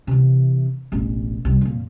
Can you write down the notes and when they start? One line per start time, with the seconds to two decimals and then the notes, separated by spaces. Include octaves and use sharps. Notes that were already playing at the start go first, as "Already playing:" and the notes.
0.07 C3 E3
0.92 E1 A1
1.45 C2 C4
1.61 F2 A#2